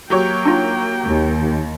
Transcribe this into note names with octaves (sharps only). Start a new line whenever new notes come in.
F#3 A#3 G4 C#5 G5
D4 D#4 F4
D#2